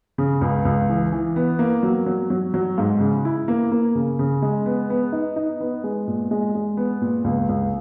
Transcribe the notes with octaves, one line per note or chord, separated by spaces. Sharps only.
C#3
C#2
C#2
E3
E3
B3
A#3
F#3
F#3
F#3
F#3
G#2
C#3
E4
A#3
A#3
C#3
C#3
G#3
B3
B3
D#4
D#4
B3
G#3
A#2
G#3
G#3
B3
A#2
C#2
C#2